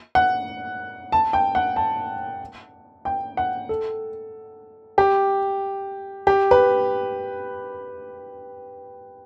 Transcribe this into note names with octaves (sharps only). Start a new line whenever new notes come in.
F#5
A5
G5
F#5
A5
G5
F#5
A4
G4
G4
B4